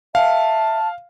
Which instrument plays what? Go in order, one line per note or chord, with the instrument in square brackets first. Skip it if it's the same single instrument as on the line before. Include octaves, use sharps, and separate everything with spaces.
[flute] E5 [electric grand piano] F5 [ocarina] A5